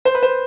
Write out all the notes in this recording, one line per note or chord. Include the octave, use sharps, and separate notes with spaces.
C5
B4
C5